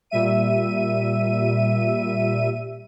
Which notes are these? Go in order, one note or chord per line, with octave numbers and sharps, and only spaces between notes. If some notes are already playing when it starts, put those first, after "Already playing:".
A#2 G3 E5 D#7